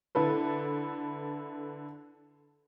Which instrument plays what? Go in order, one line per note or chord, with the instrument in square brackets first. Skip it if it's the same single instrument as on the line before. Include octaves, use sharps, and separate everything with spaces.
[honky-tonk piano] D3 E4 A4 B4